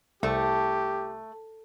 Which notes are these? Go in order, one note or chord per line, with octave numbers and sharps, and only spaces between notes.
C2 A3 G4